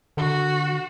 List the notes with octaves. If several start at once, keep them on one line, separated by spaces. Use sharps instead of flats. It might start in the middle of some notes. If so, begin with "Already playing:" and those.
D3 F#4